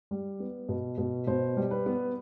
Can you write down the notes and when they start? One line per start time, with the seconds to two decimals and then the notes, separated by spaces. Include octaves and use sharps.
0.11 G3
0.40 B3
0.69 B2
0.98 B2
1.27 B2 C5
1.57 G3
1.71 B4
1.86 B3